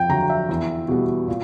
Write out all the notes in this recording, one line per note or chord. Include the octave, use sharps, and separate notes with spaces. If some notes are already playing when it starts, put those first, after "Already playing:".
Already playing: F2 G5
D3 F#3 A#5
E5
E2
B2 G3 B3
A#2